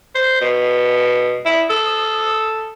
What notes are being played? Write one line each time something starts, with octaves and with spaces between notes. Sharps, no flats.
C5
B2
E4
A4